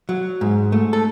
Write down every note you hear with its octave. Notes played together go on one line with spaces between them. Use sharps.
F#3
G#2
A3
A4